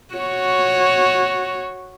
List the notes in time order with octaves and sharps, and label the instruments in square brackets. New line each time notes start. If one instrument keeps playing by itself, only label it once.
[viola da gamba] F#4 C#5